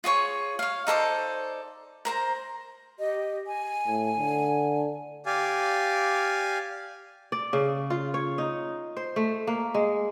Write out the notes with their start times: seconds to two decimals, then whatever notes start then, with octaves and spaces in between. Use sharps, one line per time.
0.04 F4 G#4 C#5 C#6
0.59 C#5 F5
0.87 D#4 A4 C5 D5
2.05 A#4 C5 A#5
2.99 G4 D#5
3.47 G#5
3.87 A2
4.18 D3
5.26 G4 D5 F5 G#5
7.32 D5
7.53 C#3
7.90 F4
8.14 C#5
8.38 D#4
8.97 C5
9.16 A3
9.47 A#3
9.74 G#3